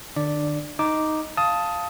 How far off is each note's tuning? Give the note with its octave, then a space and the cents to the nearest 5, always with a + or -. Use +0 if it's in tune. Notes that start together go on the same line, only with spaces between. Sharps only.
D3 +45 D4 +20 D5 +0
D#4 +0 D6 +0
F5 +0 A5 +0 D#6 +15